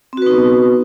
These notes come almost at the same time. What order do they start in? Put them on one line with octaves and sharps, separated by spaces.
C4 F#4 B4 D#4 B3